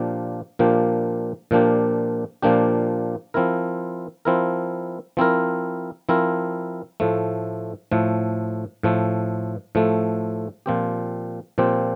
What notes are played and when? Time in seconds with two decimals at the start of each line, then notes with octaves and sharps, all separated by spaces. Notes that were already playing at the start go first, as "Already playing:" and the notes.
Already playing: A#2 F3 A#3 D4 G4
0.59 A#2 F3 A#3 D4 G4
1.51 A#2 F3 A#3 D4 G4
2.42 A#2 F3 A#3 D4 G4
3.34 F3 C4 E4 A#4
4.25 F3 C4 E4 A#4
5.17 F3 C4 E4 A#4
6.09 F3 C4 E4 A#4
7.00 A2 F3 A3
7.92 A2 F3 A3
8.83 A2 F3 A3
9.75 A2 F3 A3
10.66 A#2 F3 C4 G4
11.58 A#2 F3 C4 G4